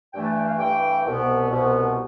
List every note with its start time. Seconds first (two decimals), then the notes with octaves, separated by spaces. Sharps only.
0.13 G2 E3 A3 G5
0.24 A5
0.37 G5
0.47 F5
0.58 G2 E3 A3 G5
1.05 C2 B2 B3
1.50 C2 B2 B3